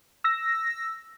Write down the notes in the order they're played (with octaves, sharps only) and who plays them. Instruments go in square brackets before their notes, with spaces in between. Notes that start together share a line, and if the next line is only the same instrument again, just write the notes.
[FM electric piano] E6 A#6